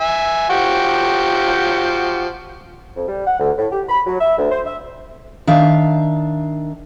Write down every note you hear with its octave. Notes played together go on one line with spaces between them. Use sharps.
E5 G#5
F3 F#4 G4
F2
G3
F#5
D2
A2
G4
B5
F#3
E5
D2
C5
E5
D#3 D4 E5 F5